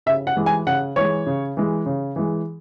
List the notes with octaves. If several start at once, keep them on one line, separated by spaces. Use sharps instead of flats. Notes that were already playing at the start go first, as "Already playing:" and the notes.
C#3 E5
F#5
E3 G#3
G#5
C#3 F#5
E3 G#3 C#5
C#3
E3 G#3
C#3
E3 G#3